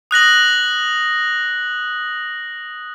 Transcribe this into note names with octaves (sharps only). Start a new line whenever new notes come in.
D#6 F#6 A#6 F#7